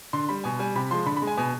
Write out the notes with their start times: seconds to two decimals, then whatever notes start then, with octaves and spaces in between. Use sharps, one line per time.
0.13 D3 C6
0.29 G3 B5
0.44 B2 G#5
0.59 G3 G#5
0.75 C3 B5
0.90 F3 G#3 C6
1.06 D3 B5
1.17 B5
1.22 G#3
1.27 G#5
1.37 B2 G#5